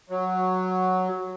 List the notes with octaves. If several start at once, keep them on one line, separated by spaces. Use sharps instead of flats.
F#3